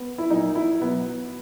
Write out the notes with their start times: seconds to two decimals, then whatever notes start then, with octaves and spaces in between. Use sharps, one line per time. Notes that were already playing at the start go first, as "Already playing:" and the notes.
Already playing: B3
0.18 E4
0.30 A#2 F#3 D#4
0.55 E4
0.81 B2 F#3 B3